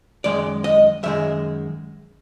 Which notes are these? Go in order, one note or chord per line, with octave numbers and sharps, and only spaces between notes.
F#2 D#3 G#3 D5
D#5
F#2 D#3 G#3 E5